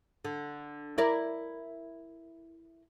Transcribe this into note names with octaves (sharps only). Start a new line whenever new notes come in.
D3
E4 A#4 D5